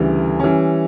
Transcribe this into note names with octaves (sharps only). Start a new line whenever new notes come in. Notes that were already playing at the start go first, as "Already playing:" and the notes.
Already playing: D2 C#3 E3 G3
E3 G3 C#4